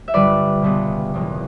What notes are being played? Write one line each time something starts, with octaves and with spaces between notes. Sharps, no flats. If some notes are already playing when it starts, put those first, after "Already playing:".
E5
G1 G2 D3 G3 B4 D5
C#2 B2 G3 B3
F#1 E2 B2